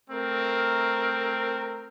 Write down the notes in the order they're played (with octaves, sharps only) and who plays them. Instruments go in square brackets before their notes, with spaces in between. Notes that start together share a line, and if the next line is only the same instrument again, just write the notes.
[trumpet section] A3 C4 A#4